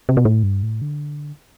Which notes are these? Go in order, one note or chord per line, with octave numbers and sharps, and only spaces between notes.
C3
B2
A2
G2
A2
D3